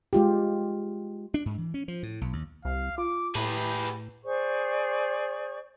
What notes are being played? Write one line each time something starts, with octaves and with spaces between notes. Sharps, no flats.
G#3 F4 G4
D4
G#2
E3
C#4
F3
A2
B1
D#2
C2 F5
F4 D6
A2 G4 G#4 B4
G#4 C5 D5 C#6